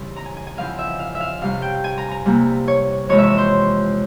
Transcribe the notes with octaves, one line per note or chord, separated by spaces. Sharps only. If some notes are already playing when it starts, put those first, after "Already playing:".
Already playing: C#3 E3 G3 C4 E4
A#5
G#5
G#5
G#5
E2 C#3 F3 C4 E4 F5
E5
F5
E5
F5
C3 G3 C#4 F5
G5
G#5
A#5
A#5
C3 G3 A#3 E4
C#5
F2 C3 E3 G#3 C#5
E5
C#5
C5